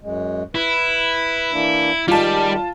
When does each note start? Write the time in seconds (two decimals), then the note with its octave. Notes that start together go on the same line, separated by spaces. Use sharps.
0.01 F#2 G#3
0.55 E4 B4
1.52 E3 A#3 D4
2.08 D#3 G3 G#3 F4 A5